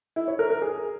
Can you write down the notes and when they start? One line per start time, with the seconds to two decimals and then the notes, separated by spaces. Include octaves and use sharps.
0.16 E4
0.28 C#5
0.39 A#4
0.50 A#4
0.62 G#4